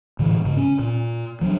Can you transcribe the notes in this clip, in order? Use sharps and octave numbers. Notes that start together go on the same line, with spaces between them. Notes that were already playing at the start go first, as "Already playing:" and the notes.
A2 D3 E3
G#2 C#3
C#4
A#2
F3 F#3 B3 D4